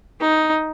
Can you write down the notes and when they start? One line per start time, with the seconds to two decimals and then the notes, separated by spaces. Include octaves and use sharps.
0.21 D#4